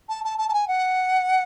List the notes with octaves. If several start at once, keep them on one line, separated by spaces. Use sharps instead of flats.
A5
A5
A5
A5
G#5
F#5